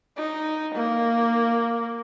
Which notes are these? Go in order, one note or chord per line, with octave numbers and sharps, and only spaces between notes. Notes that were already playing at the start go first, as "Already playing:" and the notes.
D#4
A#3